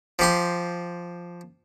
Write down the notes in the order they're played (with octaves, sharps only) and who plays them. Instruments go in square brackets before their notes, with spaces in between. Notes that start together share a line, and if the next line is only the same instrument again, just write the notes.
[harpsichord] F3 G4 C6